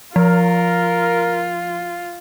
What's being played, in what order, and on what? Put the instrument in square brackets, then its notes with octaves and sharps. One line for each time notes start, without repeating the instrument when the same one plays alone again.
[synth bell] F3 [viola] F4 [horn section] A#4